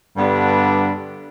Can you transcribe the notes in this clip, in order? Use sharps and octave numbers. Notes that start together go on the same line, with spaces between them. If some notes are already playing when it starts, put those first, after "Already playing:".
G2 D3 G3 B3 D4